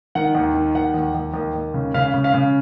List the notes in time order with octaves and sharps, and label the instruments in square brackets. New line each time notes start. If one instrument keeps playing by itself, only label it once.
[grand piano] D#3 F#5
D#2
D#3
D#2 F#5
D#2
D#2
D#2
D#2
C#3
C#3 F5
C#3
F5
C#3